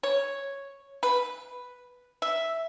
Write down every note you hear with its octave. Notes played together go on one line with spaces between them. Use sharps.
C#5
B4
E5